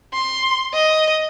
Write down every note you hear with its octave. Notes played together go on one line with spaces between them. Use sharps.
C6
D#5